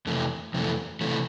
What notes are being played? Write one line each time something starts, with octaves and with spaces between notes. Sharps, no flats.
F2 C3 E3 A3
F2 C3 E3 A3
C3 E3 A3